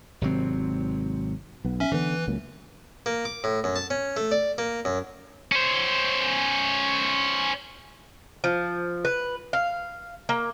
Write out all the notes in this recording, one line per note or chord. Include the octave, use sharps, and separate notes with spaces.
G#1 C3 F#3 C4
B1 B3
C#4 E5
D3 E3 B3 B4
C#2 F#3 A#3
A#3
D6
A2
F#2
A5
C#4
A3
D5
A#3
F#2
C#4 C5
F3
B4
F5
A#3